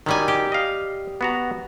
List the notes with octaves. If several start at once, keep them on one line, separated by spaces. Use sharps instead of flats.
D#3 F#3 G3 G#5
G4
D#5 F5
B3 F#4 A#5